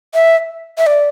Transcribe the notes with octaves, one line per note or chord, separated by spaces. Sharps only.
E5
E5
D5